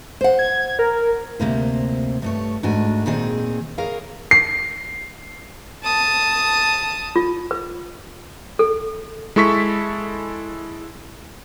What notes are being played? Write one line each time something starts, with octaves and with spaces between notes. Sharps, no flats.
C5 F#5
G#6
A#4
D2 C3 A#3 C5
G2 A3 C#5
G#2 A3 D4 F#4 G#5
A#2 D#3 C4 G#4
G#4 A#4 C#5 F5
C7
A5 D#6
F4
B4
A4
G#3 E4 A4 C#6 E6 B6